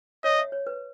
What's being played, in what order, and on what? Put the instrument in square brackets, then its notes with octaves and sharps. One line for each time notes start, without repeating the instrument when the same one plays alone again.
[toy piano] C#5 [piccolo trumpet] D#5
[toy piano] E5
C#5
B4